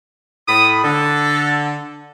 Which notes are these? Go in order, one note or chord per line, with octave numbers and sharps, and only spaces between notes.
A2 B5 D#6
D3 A4